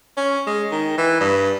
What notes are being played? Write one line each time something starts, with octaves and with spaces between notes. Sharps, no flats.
C#4
G#3
D#3
E3
G2